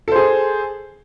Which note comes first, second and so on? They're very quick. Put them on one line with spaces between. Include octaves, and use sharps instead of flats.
A4 C5 G#4